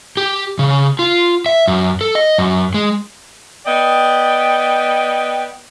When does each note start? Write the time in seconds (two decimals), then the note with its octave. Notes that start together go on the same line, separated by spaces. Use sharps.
0.17 G4
0.59 C#3
0.99 F4
1.46 E5
1.68 F#2
2.01 A4
2.15 D#5
2.38 F#2
2.74 G#3
3.66 B3 D5 D#5 G5